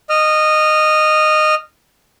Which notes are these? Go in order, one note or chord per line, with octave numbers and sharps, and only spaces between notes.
D#5 F6